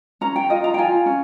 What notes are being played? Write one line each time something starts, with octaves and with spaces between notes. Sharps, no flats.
C#4 A#5
G5
F4 D#5
A#5
G5
F4 G#5
C#4